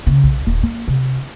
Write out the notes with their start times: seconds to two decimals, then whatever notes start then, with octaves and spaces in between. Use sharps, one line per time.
0.07 C#3
0.24 B1
0.47 D#1
0.63 A#3
0.88 C3